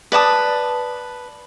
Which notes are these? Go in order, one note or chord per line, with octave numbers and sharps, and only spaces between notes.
B4 D5 A5 D#6